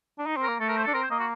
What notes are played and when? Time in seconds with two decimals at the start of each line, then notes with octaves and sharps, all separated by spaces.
0.19 D4
0.27 D#4
0.37 C4
0.43 A#4
0.48 A#3
0.60 A3 A4
0.69 A#4
0.77 C5
0.85 A4
0.87 D4
0.94 C4 A#4
1.03 C5
1.11 A#3 D#5
1.19 F#4